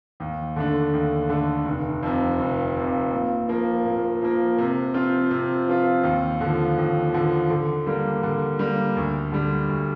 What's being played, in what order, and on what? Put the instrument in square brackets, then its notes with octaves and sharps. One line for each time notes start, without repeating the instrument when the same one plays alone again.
[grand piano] D#2
D3 A3 D4
D#2
D3 A3 D4
F1
F2 C3
F1
F2 C3
A#2
F3 A#3
A#2
F3 A#3
C3
F3 C4 F4
C3
F3 C4 F4
D#2
D3 F3
D#2
D3 F3
D3
G3 A#3
D3
G3 A#3
D2
D3 G3
D2